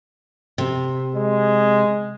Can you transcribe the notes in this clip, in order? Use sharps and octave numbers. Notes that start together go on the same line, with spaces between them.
C3
G#3